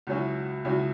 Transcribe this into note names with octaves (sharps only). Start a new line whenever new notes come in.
C#2 B2 F#3 C#4 E4
C#2 B2 F#3 C#4 E4